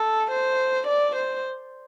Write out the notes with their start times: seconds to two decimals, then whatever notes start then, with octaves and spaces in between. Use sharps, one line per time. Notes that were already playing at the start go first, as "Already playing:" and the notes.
Already playing: A4
0.31 C5
0.87 D5
1.16 C5